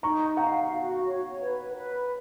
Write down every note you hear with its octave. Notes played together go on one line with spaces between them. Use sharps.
D#4 A#5 C#6
F5 F#5 A#5
F#4
C#5
B4
B4